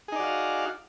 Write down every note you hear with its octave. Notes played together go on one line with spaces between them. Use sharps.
D#4 F#4 G#4 D5 F5